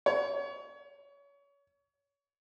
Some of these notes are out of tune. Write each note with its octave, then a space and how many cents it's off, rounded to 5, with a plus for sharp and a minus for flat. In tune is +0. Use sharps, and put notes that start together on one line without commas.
C#5 +30